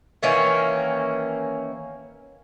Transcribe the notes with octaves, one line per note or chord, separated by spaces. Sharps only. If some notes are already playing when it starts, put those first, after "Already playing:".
D#3 E3 A#3 C#4